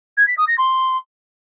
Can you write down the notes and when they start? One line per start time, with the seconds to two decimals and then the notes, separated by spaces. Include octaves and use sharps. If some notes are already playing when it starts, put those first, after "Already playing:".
0.17 G#6
0.27 B6
0.38 D#6
0.48 A#6
0.58 C6